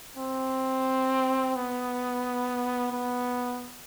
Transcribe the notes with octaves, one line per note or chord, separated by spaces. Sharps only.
C4
B3
B3